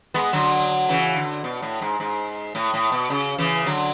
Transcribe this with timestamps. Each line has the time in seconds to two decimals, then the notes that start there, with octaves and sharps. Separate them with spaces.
0.14 G#3 B3
0.33 D3 F#3
0.88 C#3 E3
1.16 D3
1.44 B2
1.62 A2
1.81 G#2
2.00 G#2
2.55 A2
2.74 A2
2.92 B2
3.10 C#3
3.38 C#3 E3
3.66 D3 F#3